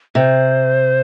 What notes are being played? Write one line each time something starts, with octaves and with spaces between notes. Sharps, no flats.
C3 C5